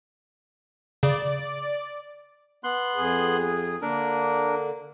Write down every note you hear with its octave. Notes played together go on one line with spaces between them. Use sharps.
C#3 D5
B3 C6 F#6
F2 G#4
D3 A#3 D4 A#4